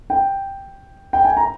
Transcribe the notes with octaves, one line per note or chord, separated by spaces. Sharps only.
G5
G5
G#5
A#5